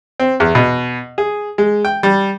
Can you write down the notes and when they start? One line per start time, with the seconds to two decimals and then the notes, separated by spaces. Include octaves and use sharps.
0.20 C4
0.40 E2
0.55 B2
1.18 G#4
1.58 G#3
1.85 G5
2.03 G3